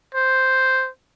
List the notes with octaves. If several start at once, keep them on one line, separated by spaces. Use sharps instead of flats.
C5